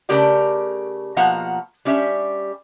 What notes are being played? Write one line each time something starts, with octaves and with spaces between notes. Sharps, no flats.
C#3 A3 G4 A#4 D5 G5
B2 F3 A#3 F5 F#5 A#5
G3 C#4 G4 E5